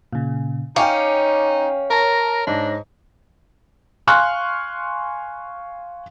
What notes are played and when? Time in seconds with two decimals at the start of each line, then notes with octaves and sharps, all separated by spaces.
0.13 A#2 C#3
0.76 C#4 D#4 F5 G5 D6
1.90 A#4 C#5 A5 A#6
2.47 G#2 D4
4.07 F5 G#5 C6 C#6 F6 F#6